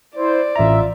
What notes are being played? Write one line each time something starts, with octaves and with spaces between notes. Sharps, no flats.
E4 C5 D5
A1 F4 E5 A#5